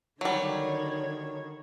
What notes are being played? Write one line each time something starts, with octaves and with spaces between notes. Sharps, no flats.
D3 D#3 F#3 G3 C#5